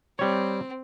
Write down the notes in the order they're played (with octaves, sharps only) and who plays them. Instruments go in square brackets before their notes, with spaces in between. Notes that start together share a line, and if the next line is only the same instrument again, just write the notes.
[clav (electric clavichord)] G3 C#5 [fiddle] C4